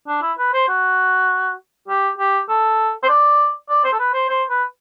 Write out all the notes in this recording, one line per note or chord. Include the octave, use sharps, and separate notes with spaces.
D4
E4
B4
C5
F#4
G4
G4
A4
C5
D5
D5
C5
A4
B4
C5
C5
B4